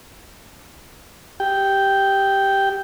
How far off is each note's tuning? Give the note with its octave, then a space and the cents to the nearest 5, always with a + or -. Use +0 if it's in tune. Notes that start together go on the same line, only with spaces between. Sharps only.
G4 +0 G5 +0